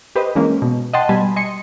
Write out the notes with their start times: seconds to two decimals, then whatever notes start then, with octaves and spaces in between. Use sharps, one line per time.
0.16 G4 B4 C5 D#5
0.35 E3 G#3 A#3 C#4
0.62 B2
0.93 D#5 F#5 G5 A5 C6
1.09 B2 G3 G#5 A5 B5
1.36 D#5 G#5 C6 C#7